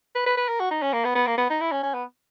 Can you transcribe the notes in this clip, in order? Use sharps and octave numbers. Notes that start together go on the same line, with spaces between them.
B4
B4
B4
A#4
F#4
D#4
C#4
A#3
B3
B3
A#3
B3
D#4
E4
C#4
C#4
B3